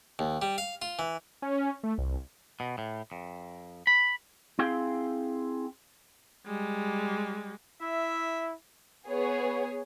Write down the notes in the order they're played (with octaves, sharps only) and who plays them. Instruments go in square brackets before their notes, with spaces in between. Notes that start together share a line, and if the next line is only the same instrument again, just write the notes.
[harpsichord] D#2
G3
F5
F4
E3
[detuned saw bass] C#4
A3
C2
[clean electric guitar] B2
A2
F2
B5
C4 E4 G#4 F5 G5
[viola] G3 G#3
[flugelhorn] E4 [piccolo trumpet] E5
[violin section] B3 G#4 C#5